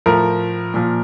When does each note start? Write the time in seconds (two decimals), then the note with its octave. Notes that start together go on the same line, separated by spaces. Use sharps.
0.06 A2 F3 A#4
0.74 A#2 F3